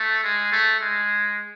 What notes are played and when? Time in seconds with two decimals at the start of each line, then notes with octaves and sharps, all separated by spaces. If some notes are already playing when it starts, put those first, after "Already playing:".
Already playing: A3
0.23 G#3
0.52 A3
0.80 G#3